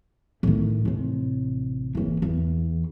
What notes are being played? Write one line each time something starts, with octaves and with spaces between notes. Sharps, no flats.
A2 D#3
A1 C3
F#1 E3
E2